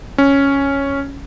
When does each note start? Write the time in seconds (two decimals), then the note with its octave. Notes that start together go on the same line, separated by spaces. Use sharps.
0.18 C#4